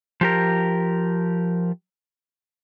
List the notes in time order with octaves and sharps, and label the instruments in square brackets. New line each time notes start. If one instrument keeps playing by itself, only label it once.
[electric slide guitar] F3 G4 A#4